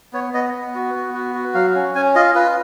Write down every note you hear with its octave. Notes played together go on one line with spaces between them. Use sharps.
B3 C#5
B3 D#5
B3
F#4
B3
F#4
F#4
F#3 F5
C#4
C#4 G#5
F4 D#5
F4 B4